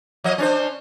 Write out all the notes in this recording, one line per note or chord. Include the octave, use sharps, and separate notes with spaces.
F3 D#5
C#4 D4 C5